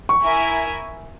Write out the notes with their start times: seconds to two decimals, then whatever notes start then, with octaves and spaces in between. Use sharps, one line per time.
0.09 C#6
0.23 E4 A#4 E5 G#5